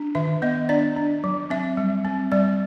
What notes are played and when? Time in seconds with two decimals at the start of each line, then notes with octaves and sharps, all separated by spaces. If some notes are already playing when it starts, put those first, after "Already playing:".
Already playing: D4
0.15 D#3 E5
0.42 B3 D#5
0.69 D4 D5
0.96 D4
1.24 F#3
1.50 C4 E5
1.77 G3
2.05 C4
2.32 G3 D5